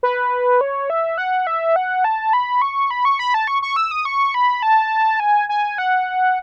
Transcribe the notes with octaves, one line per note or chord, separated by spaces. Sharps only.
B4
C#5
E5
F#5
E5
F#5
A5
B5
C#6
B5
C#6
B5
A5
C#6
C#6
E6
D#6
C#6
B5
A5
G#5
G#5
F#5